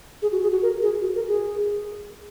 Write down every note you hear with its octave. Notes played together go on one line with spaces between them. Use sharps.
G#4
F#4
G#4
F#4
A#4
G#4
F#4
A#4
G#4